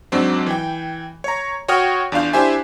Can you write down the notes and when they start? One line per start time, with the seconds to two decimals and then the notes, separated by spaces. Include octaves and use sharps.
0.12 G#2 F#3 C4 D4
0.47 E3 G5
1.24 C#5 A#5
1.68 F#4 C#5 G5 D#6 F6
2.12 E2 D4 F4 F5 G6
2.33 D4 E4 G4 C5 E5 G#5